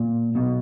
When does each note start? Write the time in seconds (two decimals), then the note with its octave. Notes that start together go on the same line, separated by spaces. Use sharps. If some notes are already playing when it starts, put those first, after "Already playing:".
Already playing: A#2
0.35 B1 B2